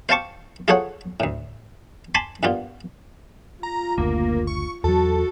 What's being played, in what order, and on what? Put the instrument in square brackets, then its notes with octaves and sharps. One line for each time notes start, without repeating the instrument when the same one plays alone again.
[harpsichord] C5 F5 G5 A5 C#6 D6
F4 G#4 A4 C5 C#5 F#5
D2 A2
G#5 A5 B5 C6 D6
G2 A#2 B3 F4
[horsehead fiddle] F4 [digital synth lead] A#5
[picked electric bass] F#1 D2 [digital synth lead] A#3
[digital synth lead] C#6
[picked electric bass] E2 F#3 [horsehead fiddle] F#4 [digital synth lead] A4